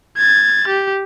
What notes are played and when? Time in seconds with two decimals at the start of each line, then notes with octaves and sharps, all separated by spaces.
0.17 G#6 A6
0.68 G4